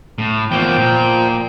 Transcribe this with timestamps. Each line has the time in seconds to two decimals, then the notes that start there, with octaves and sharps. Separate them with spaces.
0.18 A2
0.51 E2 F3 A#3 G5 G6
0.78 A#2